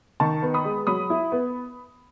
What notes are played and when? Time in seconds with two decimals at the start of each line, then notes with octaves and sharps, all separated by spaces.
0.20 D#3 A5 C#6
0.42 B3
0.54 B5 D#6
0.65 G#3
0.87 F#3 B5 D#6
1.10 E4
1.32 B3